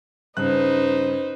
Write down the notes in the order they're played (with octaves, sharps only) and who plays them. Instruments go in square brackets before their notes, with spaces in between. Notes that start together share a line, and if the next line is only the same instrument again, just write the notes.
[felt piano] G2 C#3 F#6 [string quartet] D#4 B4 C5